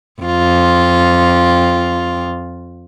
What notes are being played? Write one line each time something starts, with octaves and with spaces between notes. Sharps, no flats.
F2 F4